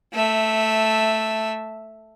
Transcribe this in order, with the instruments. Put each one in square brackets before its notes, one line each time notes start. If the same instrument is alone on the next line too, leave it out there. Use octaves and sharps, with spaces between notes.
[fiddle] A3 E5